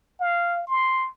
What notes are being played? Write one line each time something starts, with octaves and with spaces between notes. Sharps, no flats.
F5
C6